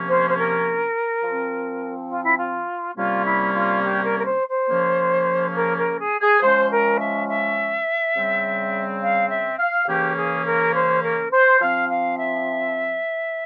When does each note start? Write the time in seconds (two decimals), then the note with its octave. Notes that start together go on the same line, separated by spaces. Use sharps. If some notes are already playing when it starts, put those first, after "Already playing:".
Already playing: C3 F3 A#3 C#4
0.08 C5
0.30 C5
0.38 A#4
1.24 F3 C4
2.10 F4
2.24 E4
2.38 F4
2.96 C3 G3 A#3 C#4 F4
3.26 E4
3.54 F4
3.83 G4
4.04 A#4
4.19 A#4
4.26 C5
4.49 C5
4.69 C#3 F3 A#3 C#4
5.56 A#4
5.78 A#4
5.99 G#4
6.21 G#4
6.42 F3 G#3 C#4 C5
6.71 A#4
6.99 E5
7.28 E5
8.16 C#3 G3 C4
9.02 F5
9.30 E5
9.59 F5
9.87 C#3 E3 A#3 C#4 G4
10.16 G#4
10.46 A#4
10.74 C5
11.03 A#4
11.32 C5
11.61 F3 C4 F5
11.90 F5
12.18 E5